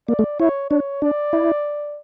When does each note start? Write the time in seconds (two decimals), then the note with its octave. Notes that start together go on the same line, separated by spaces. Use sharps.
0.08 A#3 D5
0.19 A3
0.40 E4 C#5
0.70 D4 C#5
1.02 D4 D5
1.33 E4